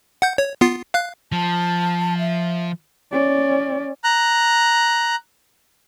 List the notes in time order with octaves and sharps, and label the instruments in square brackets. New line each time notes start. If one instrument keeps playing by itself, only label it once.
[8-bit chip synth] F#5 G6
C#5
B3 F4 C7
F5 F#6
[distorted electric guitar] F3 [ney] A5
[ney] E5
[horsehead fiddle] C#4 D5
[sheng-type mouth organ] A#5 F#6